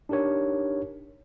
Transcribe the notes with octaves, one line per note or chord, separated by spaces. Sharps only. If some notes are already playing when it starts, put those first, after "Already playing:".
D4 D#4 G4 A#4 C#5